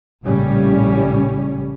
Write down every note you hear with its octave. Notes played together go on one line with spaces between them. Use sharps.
A#1 A2 C#3 G3 C#4